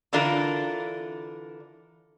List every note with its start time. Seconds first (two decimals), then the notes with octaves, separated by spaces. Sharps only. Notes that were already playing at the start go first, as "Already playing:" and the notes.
0.13 D3 E3 D4 F4 A#4